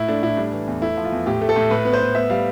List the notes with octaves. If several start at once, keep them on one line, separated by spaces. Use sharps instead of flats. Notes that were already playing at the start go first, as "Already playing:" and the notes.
Already playing: A2 E4
A3 D4
A2 E4
G3 D4
E3
E2
A3 E4
F3
F4
E2
A2 G4
A3
A4
A2
A2 B4
B3
C5
A2
B3 E5
G3 F5